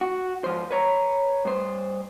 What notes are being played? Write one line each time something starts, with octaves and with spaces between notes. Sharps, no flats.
F#4
G#2 F3 C5
B4 C#5 A#5
G2 C5